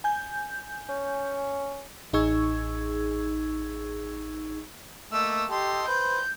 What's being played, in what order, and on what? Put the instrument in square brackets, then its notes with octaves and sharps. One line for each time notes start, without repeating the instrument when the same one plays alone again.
[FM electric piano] G#5 G6
[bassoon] C#4
[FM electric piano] A1 D#4 G#4 C#6 E6 G#6
[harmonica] A3 A#3 D#5 [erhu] E6
[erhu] G4 [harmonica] A4 D#5 C6
[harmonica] B4 C5 [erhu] G6